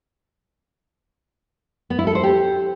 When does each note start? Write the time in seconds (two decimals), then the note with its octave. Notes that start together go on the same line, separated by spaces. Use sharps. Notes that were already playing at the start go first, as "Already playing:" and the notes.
1.90 B3
1.99 E4
2.07 A4
2.15 C5
2.23 G4